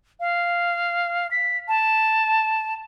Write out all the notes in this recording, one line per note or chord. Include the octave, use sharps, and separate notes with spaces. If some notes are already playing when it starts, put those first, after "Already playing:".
F5
B6
A5